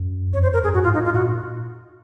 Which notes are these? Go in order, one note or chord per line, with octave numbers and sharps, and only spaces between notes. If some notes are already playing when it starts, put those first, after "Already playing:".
Already playing: F#2
F2 C#5
F#2 C5
F#2 A#4
F#2 G#4
G#2 F#4
F4
G#2
D#4
G#2 F4
A#2 F#4